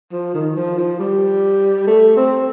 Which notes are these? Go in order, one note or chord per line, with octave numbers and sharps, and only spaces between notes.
F3
D#3
F3
F3
G3
A3
C4